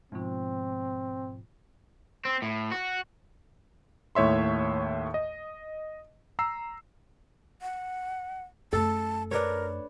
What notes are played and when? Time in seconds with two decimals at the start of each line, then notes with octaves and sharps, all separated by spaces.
0.12 G#2 B2 F3 C4
2.25 C4
2.42 A2
2.72 F#4
4.15 D#2 A2 C#5 E5 C6
5.14 D#5
6.39 A#5 E6 C7
7.62 F#5
8.73 F#2 A3 A4 A5
9.31 D4 A#4 B4 C#5